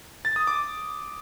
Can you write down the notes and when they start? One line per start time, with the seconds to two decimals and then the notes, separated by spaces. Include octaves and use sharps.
0.25 A6
0.36 D#6
0.47 D6